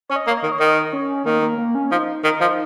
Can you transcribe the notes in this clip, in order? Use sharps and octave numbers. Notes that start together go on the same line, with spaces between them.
C#4 C#5
D#5
A#3
C#5
D#5
D#3
C#5
D#3 D#5
C#4
D#3 A#3
A#3
A#3
C#4
F3 D#4
D#3
F3